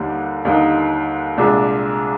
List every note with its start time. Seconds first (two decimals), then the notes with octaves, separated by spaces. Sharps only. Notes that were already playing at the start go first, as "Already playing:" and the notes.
Already playing: D#2 D3 G3 A#3 D#4
0.45 D#2 D3 G3 A#3 D#4
1.38 C2 A#2 G#3 D4